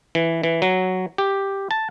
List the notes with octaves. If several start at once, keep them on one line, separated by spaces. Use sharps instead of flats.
E3
E3
F#3
G4
A5